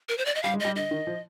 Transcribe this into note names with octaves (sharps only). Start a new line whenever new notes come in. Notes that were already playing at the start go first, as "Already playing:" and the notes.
A#4
C5
D5
D#5
G3 F5
G#3
G3 D#5
D3 D#5
D#3
F3